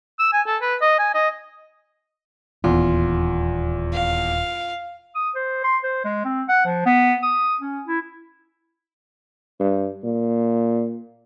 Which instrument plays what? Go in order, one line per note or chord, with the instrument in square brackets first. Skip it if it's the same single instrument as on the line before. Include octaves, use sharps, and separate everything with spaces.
[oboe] E6
G#5
A4
B4
D#5
G#5
D#5
[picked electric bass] D#1 [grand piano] E2 [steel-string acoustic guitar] F4
[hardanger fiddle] F5
[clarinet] D#6
C5
C6
C5
G#3
C4
F#5
F3
B3
D#6
C#4
E4
[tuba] G2
A#2